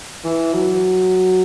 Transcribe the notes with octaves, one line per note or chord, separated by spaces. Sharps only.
E3
F#3